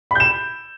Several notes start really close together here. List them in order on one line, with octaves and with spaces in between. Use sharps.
B5 G6 E7